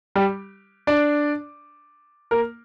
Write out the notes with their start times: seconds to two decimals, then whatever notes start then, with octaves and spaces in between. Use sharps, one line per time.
0.15 G3 G4
0.87 D4 D5
2.31 A#3 A#4